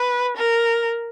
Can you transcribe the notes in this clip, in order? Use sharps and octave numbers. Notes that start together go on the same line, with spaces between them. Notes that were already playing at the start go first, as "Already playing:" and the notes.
Already playing: B4
A#4